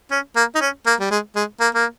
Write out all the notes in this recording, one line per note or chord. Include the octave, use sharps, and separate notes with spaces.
C#4
A#3
D#4
C#4
A#3
G3
G#3
G#3
A#3
A#3